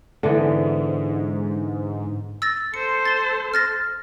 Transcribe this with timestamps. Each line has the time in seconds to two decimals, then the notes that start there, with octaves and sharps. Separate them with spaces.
0.23 G#2 D3 E3 B3
2.42 E6 A6 A#6
2.74 A4 C5 C#7
3.05 A6 G7
3.54 F6 A6 A#6